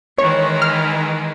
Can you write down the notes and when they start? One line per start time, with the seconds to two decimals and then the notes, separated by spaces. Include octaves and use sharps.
0.18 D#3 E3 G#3 C#5
0.62 F6